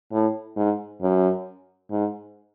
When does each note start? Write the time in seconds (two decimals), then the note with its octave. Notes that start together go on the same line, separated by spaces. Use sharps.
0.12 A2
0.56 G#2
1.01 F#2
1.91 G#2